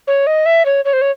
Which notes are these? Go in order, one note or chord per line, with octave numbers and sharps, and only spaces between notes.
C#5
D#5
E5
C#5
C#5
C5
C#5